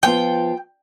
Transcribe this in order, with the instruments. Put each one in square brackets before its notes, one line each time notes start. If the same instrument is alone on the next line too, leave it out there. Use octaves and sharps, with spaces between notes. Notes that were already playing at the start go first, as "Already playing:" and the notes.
[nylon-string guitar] F3 B3 F4 [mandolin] G5